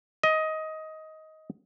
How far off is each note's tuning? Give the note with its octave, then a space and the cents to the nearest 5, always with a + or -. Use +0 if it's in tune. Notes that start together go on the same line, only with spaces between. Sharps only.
D#5 +15